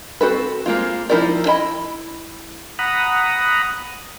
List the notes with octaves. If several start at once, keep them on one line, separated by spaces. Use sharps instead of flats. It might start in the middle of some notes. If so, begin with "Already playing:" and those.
C4 F#4 A4 B4
G#3 A#3 C4 F4
F3 D#4 E4 A#4 D5
D4 E4 D#5 B5
F#5 A#5 B5 D#6